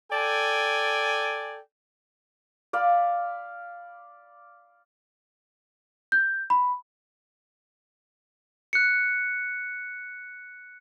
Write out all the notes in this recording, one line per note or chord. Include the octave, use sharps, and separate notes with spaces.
A4 D5 G5 G#5
D5 F5 B5
G6
B5
F#6 C#7